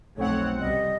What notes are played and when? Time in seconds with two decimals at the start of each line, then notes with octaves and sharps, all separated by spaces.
0.17 B1 F2 A3 C4 C#5 F#5
0.60 C#2 C3 G3 D#5